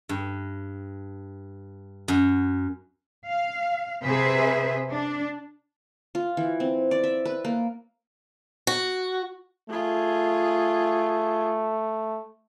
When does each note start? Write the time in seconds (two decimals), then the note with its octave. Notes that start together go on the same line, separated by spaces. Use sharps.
0.09 G2
2.08 F#2
3.28 F5
4.03 C3 G#4 B4 C5 E5
4.91 D4
6.15 F4
6.37 E3
6.60 C4
6.91 D5
7.04 E5
7.25 B4
7.45 A#3
8.67 F#4
9.70 A3 F4 G#4